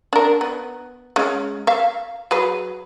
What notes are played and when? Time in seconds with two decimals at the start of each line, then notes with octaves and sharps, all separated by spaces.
0.13 D4 A#4
0.41 B3
1.16 G#3 C#4
1.67 E5 F5
2.31 F#3 G#4 B4